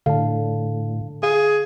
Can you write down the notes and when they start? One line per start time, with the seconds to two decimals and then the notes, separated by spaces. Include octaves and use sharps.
0.06 A2 D3 F5 A5
1.23 G#4 F5